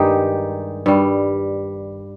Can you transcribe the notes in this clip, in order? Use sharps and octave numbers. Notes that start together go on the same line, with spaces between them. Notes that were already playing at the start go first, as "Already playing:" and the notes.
Already playing: G2 D#3 G#3 D#4 G4
G2 G3